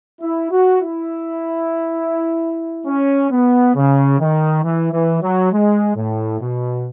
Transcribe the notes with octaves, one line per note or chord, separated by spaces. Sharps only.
E4
F#4
E4
C#4
B3
C#3
D#3
E3
E3
F#3
G#3
A2
B2